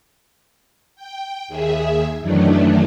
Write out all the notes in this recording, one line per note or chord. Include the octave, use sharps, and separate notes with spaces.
G5
D#2 G#4 E5
F#2 D#3 E3 F#3 A3 D4